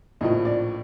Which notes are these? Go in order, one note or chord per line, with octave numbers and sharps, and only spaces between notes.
A#1 A2 F3 D#5
D5